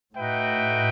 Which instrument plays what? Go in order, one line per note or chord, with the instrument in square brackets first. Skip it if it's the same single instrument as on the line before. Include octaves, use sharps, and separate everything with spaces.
[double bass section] A2 [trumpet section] D#4 F#4 B4 E5 G5